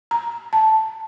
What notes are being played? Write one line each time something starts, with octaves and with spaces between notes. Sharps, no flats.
A#5
A5